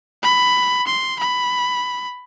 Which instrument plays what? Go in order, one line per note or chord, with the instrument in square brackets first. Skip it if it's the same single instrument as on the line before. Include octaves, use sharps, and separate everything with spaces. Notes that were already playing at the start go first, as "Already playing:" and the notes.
[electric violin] B5
C6
B5